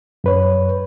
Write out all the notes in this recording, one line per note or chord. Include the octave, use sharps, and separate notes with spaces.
F#2 B4 C#5